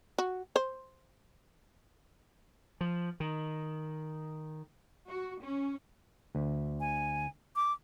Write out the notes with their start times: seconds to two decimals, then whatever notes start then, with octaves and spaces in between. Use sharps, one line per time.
0.18 F#4
0.56 C5
2.81 F3
3.20 D#3
5.06 F#4
5.41 C#4
6.35 D2
6.80 G#5
7.56 D6